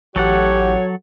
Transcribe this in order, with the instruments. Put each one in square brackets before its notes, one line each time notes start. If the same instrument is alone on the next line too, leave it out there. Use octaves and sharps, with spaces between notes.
[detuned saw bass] A1 [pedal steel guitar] F#3 A4 F#5 [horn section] F#4 C#5 [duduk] G4